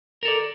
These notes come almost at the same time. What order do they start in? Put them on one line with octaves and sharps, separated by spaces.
A#4 A4 D5